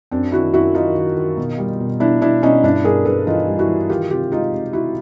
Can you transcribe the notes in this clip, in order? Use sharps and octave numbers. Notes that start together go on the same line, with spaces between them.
F#2 C4 D4
D#3 E4 F#4
F#2 E4 F#4
D#3 D#4 F4
D#3
D#3
B2
G3
B2
B2 D4 E4
B2 D4 E4
B2 C#4 D#4
G2 D4 E4
G2 G#4 A#4
G2 A4 B4
E3 D#4 F4
G3
E4 F#4
E3
D#3 F4 G4
C3 F4 G4
G#3 D#4 F4
C3
C3 E4 F#4